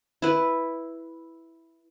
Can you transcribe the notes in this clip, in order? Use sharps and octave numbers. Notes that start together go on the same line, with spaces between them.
E4 B4